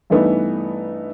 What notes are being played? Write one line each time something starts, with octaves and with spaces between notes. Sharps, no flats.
G2 E3 A3 B3 D4 D#4